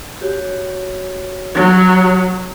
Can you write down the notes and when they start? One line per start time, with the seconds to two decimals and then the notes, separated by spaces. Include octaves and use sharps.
0.21 F#4 G4 C#5
1.55 F#3